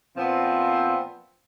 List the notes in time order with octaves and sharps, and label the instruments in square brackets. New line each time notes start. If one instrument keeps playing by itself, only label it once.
[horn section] A#2 F3 B3 C4